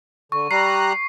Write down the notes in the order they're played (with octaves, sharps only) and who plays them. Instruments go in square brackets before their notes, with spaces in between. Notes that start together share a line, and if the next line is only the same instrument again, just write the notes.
[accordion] D3 [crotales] C#6
[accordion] G3 A#5 F#6 [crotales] C7